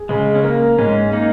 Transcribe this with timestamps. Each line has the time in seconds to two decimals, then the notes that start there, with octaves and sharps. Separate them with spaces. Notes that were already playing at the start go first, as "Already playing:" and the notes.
Already playing: G#4
0.09 C#3 G#3
0.35 C#4
0.43 A#3 A#4
0.78 G#2 G#3 C#4
1.13 A#3 D#4